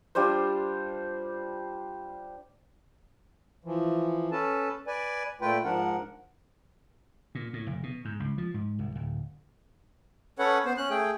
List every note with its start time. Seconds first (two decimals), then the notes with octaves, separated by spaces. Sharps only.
0.15 G3 D4 F4 C5
3.65 E3 F3
4.31 C#4 A4 B4 A5
4.87 B4 D5 G#5
5.41 A#2 A3 F4 B4 G5
5.64 G#2 F3 D4 A#4 F#5
7.35 A#2
7.53 A2
7.67 F1
7.83 B2
8.05 G#2
8.20 C#2
8.38 F3
8.54 G#2
8.79 C2
8.95 D1
10.39 C#4 A4 B4 C#5 F#5
10.65 B3 C5
10.77 C#4 F#6
10.90 A3 G#4 G5